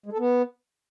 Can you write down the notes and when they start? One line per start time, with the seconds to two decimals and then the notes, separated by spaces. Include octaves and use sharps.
0.06 G#3
0.12 A4
0.19 B3